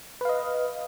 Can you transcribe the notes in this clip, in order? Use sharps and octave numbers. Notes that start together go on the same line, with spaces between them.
B4 D#5 F5